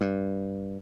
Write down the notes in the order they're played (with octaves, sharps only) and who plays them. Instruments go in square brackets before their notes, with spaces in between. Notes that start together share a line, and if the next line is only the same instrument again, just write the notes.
[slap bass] G2